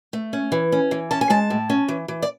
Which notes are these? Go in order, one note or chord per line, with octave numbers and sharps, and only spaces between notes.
A3
C#4
E3
C#4
E3
C#4 A5
G#5
G#3 A5
A2
C#4
E3
E3
D5